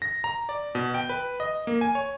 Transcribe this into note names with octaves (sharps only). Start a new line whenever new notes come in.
A#6
A#5
D5
B2
G5
B4
D#5
A#3
G#5
C#5